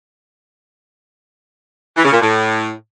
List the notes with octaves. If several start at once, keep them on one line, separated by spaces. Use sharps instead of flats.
E3
C#3
A#2
A2